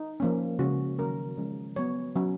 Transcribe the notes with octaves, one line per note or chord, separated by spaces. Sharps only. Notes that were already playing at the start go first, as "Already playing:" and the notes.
Already playing: D#4
F3 A#3 C#4
C#3 G#3 C#4 F#4
D#3 F#3 A#3 C#4 A#4
F3 G#3 C#4
F#3 B3 C#5
F#3 C#4